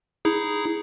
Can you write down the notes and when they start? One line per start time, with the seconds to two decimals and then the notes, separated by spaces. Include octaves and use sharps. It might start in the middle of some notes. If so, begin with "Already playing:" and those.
0.25 D#4 E4 G#4